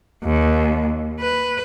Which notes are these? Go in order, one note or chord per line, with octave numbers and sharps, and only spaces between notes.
D#2
B4